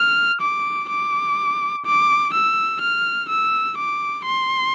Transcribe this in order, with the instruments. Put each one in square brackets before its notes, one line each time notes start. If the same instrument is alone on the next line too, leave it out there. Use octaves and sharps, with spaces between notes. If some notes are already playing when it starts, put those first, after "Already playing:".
Already playing: [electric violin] F6
D6
D6
D6
E6
F6
E6
D6
C6